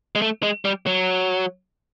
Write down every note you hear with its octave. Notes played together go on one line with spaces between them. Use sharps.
G#3
A3
G#3
G3
F#3